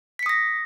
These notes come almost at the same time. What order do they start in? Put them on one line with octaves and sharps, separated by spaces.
B6 C#7 D#6 A#6